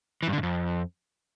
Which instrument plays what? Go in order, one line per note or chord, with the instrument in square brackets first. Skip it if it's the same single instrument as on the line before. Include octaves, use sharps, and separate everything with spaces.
[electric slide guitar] E3
G2
D3
G#2
F2